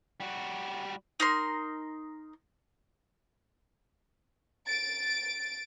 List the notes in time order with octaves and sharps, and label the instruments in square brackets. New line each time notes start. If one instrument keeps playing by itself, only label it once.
[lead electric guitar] G3 F#4
[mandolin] D#4 A#4 C6
[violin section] A6 D7